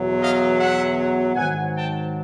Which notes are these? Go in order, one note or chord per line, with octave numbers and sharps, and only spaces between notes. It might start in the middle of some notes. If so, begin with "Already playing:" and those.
Already playing: E2 B2 F#3
D#5 F5
E5 F#5
G#2 D#3 F#3 F#5 G#5
G5 A5